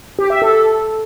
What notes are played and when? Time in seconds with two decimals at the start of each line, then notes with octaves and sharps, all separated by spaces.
0.19 G4
0.30 E5
0.42 A4
0.53 A4